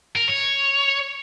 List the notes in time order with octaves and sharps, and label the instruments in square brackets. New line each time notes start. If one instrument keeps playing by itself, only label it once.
[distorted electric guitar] A#4
C#5